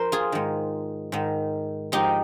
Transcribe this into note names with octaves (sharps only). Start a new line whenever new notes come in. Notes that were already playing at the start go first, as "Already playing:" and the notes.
Already playing: F3 A#4 C5
F4 G#4
G#2 D#3
G#2 D#3
G#2 F3 D#4 G4